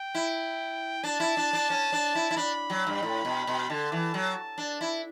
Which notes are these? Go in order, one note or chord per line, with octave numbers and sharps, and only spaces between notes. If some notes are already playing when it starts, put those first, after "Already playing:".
Already playing: G5
E4
D4 A5
E4
D4
D4
C#4
D4
E4
E4
D4 B5
F#3
G2
A2
B2
B2
D3 A5
E3
F#3
D4
E4